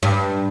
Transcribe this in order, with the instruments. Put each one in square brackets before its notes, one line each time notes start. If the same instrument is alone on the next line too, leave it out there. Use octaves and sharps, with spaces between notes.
[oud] G2